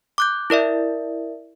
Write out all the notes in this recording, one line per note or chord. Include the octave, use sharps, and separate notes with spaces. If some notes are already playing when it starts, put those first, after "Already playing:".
D6 F#6 G6
E4 A#4 D5 E5